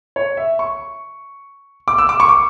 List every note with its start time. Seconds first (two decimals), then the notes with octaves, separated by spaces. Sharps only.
0.16 C#5
0.37 E5
0.59 C#6
1.88 D6
1.98 E6
2.09 D6
2.20 C#6
2.29 D6